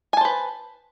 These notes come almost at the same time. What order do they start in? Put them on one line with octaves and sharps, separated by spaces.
G#5 A5 C5 B4